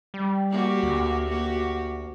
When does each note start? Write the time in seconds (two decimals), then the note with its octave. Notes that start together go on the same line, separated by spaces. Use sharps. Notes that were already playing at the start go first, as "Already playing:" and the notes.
0.14 G3
0.50 A#3 F#4 G4
0.83 D2
1.27 A#3 F#4 G4